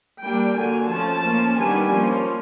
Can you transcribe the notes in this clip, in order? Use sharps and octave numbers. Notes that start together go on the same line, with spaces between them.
G3 A#3 D4 G5
D3 F#3 A#3 G#5
F3 A3 C#4 A5
F3 A#3 C#4
D#3 G3 B3 D4 G#5
F3 A#3 C#4